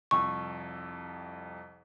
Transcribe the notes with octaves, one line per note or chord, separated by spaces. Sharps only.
C2 F2 C#6 E6